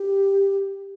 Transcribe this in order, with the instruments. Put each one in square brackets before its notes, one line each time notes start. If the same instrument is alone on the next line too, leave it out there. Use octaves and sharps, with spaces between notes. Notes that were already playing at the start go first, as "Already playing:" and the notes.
Already playing: [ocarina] G4